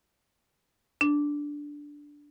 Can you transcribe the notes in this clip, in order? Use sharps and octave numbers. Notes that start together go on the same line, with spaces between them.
D4